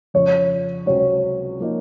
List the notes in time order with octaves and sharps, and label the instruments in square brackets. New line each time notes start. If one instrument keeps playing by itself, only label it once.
[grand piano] F2 C#3 F3 [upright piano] C#5
[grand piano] C#2 C3 F#3 C4 F#4 [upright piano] C#5
[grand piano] F3 A#3 D#4